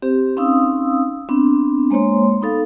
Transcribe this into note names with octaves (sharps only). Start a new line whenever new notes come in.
C4 G4 C5
C4 C#4 D#4 F5 D#6 E6
B3 C4 D4
G#3 A#3 C5 C#5 C6
B3 D#4 A4 F5